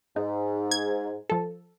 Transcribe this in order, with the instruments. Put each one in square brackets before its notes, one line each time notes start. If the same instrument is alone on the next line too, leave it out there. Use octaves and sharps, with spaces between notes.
[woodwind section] G#2 [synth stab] D#4
[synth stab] G#6
F3 A4